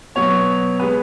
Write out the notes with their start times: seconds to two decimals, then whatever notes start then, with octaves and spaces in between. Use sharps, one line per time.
0.15 B2 F#3 B3 C#5
0.79 G#3 B3 B4